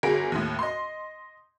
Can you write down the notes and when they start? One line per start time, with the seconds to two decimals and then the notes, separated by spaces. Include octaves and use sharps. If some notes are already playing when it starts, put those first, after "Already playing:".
0.03 G1 F#4 G#4 A#4 D7
0.32 D#2 A2
0.59 D#5 C6